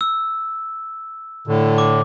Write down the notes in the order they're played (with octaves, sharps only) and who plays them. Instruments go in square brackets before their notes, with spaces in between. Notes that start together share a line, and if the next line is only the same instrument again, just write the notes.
[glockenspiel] E6
[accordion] A2 D3
[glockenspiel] D6